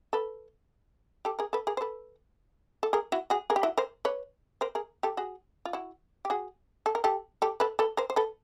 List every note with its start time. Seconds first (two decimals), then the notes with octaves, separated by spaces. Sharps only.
0.13 A4 B4
1.25 G4 A4
1.39 G#4 A#4
1.53 A4 B4
1.67 G#4 A#4
1.77 C5
1.81 A4 B4
2.83 A4
2.93 G#4 A#4
3.12 E4 F#4
3.30 F#4 G#4
3.50 G#4 A#4
3.56 G4
3.63 E4 F#4
3.78 A#4 C5
4.05 B4 C#5
4.61 A#4 C5
4.75 G#4 A#4
5.03 G4 A4
5.17 F#4 G#4
5.65 F4
5.73 E4 F#4
6.25 G4
6.30 F#4 G#4
6.86 A4
6.95 A#4
7.04 G4 A4
7.42 G4 A4
7.60 A4 B4
7.79 A4 B4
7.97 A#4 C5
8.10 C5
8.16 A4 B4